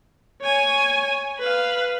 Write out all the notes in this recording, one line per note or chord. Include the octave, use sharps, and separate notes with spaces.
C#5 G#5
B4 F5